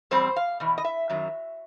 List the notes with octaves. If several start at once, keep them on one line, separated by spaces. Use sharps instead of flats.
E2 B2 G3 C4 C5
F5
E2 B2
D#5
E5
F#2 D#3 F#3